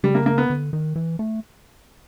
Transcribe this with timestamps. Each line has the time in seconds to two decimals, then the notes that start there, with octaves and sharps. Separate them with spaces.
0.03 C#3 G3
0.15 A#3
0.26 A#3
0.38 B3
0.50 D3
0.73 D#3
0.96 E3
1.19 A3